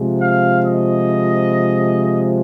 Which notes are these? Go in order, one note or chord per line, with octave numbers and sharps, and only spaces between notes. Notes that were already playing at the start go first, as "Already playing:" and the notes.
Already playing: C3 F3 G#3
F5
D#5